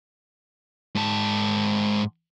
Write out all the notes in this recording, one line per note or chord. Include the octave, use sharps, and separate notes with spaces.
G#2 A5